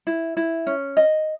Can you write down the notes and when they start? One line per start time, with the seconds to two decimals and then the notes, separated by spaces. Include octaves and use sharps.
0.07 E4
0.37 E4
0.67 C#4
0.97 D#5